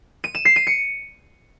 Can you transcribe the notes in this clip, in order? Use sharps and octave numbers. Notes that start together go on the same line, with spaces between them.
D#7
E7
C7
D#7
C#7